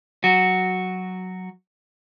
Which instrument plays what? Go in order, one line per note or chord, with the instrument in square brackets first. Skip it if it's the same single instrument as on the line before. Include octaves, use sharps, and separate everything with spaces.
[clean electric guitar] F#3 F#4